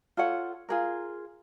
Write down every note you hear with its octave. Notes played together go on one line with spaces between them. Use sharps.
F4 A4 C#5 F#5
F4 G#4 A#4